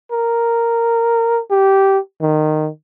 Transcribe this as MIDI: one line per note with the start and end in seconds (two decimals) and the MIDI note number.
0.12 1.40 70
1.51 1.99 67
2.21 2.69 51